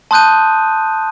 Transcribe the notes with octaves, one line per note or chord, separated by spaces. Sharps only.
A5 C6 D#6 F#6 G6 D#7